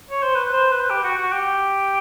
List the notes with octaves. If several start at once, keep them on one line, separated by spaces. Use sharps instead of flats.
C#5
C5
B4
C5
B4
G4
F#4
F#4
G4